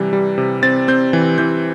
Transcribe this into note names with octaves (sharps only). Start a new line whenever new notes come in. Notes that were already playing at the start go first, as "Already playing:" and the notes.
Already playing: C3 E3 G3
G3
C3
C4 A6
C4 G6
E3
E3 G6